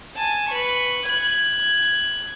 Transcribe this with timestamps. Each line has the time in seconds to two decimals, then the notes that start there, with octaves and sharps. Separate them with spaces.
0.16 G#5 A5
0.50 B4 C#6
1.06 F#6 G#6